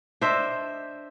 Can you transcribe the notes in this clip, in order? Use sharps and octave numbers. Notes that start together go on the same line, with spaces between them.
D4 C5 D#5 E5